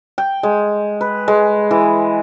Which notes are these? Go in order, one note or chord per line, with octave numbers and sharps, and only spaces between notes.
G5
G#3
B4
G#3
E3